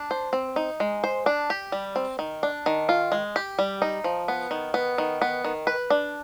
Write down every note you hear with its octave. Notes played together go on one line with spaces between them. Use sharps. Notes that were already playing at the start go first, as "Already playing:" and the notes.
Already playing: D4
C5
C4
D#4
G#3
C5
D4
G4
G3
C4
D#3
D4
D#3
F4
G#3
G4
G3
D#4
F3
B3
D#3
B3
D#3
B3
D#3
B4
D4